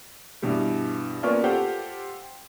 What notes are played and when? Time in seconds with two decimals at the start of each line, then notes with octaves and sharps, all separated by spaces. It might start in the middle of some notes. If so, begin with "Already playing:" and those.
0.42 G2 B2 E3 G3
1.23 A#3 B3 C#4 F4 A#4 D5
1.44 F4 G4 A4 C5 F#5 G5